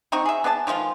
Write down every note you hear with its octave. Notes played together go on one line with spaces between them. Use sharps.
C4 D#4 F#4 C#6
G#4 E5
B3 G#4 D5 A5
D#3 F3 G#3 F4